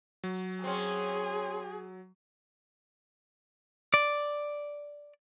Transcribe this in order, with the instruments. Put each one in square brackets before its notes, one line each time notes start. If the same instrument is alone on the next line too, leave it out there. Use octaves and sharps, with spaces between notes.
[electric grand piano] F#3
[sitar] C4 C#4 [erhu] G#4
[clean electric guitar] D5